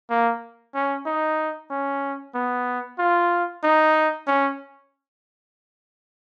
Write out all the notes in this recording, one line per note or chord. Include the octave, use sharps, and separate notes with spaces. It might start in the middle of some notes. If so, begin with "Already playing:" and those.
A#3
C#4
D#4
C#4
B3
F4
D#4
C#4